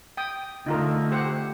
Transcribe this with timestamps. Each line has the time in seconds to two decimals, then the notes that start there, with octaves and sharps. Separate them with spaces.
0.17 G5 D#6
0.66 D3 A3 D#4 F4 A#4
1.11 G4 C5 F#5